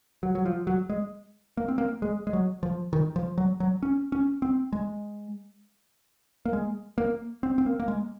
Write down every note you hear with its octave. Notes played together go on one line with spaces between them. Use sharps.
F#3
F#3
F3
F#3
G#3
A#3
C4
A#3
G#3
G#3
F#3
F3
D#3
F3
F#3
F#3
C#4
C#4
C4
G#3
A#3
G#3
A#3
C4
C4
A#3
A#3
G#3